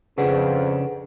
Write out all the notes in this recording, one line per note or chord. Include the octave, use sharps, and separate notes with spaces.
F2 C#3 C#4 D4 G#4 B4 F#5